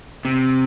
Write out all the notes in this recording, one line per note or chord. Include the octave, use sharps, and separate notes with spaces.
C3